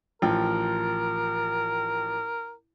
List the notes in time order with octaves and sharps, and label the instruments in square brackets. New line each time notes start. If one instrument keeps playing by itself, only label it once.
[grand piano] A1 F3 G5 [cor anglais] A#4